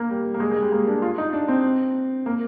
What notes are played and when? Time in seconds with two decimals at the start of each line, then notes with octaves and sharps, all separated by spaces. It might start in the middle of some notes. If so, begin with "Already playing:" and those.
Already playing: A#3
0.10 G3
0.34 A#3
0.40 G#3
0.51 G#3
0.61 G3
0.72 A#3
0.87 D4
1.02 F4
1.18 D#4
1.33 D4
1.48 C4
2.26 A#3